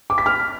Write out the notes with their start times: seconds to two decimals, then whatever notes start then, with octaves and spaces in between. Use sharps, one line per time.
0.10 D6
0.18 B6
0.26 F6